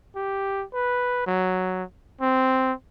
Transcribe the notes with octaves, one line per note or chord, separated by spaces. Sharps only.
G4
B4
F#3
C4